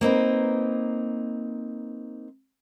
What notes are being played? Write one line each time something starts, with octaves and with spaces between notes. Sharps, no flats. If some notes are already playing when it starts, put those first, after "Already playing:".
A#3 C4 D#4 B4